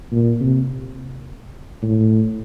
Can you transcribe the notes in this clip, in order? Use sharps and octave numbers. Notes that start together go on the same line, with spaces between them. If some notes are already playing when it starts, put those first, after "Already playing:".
A#2
C3
A2